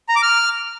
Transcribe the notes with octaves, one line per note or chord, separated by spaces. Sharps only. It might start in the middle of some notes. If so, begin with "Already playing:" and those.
A#5
D6
F6